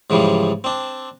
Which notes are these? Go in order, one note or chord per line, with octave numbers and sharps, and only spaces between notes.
G#2 C#3 E3 F3 G3
C4 D4